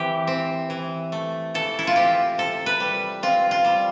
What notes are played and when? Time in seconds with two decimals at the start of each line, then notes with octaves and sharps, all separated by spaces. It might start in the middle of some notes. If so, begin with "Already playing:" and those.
Already playing: E3 C4 G4
0.27 C4
0.70 E3
1.12 A3
1.54 E3 A4
1.79 E4
1.87 F4
1.96 C4 G4
2.38 C3 A4
2.66 B4
2.80 G3
3.23 C4 F4
3.51 F4
3.64 G3